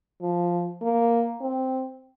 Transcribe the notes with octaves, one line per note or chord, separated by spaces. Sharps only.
F3
A#3
C4